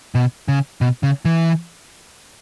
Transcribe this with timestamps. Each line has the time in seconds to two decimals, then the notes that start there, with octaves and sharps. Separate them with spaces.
0.15 B2
0.48 C#3
0.81 B2
1.03 C#3
1.25 E3